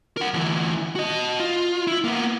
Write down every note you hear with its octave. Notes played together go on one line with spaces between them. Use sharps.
A#4 F#5
D2 E3
F#4 D#5
F4
E4
A#3 B3